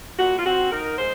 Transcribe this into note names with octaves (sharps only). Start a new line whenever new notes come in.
A#2 F#4
F4
C4 F#4
D#4 A#4
G#3 C5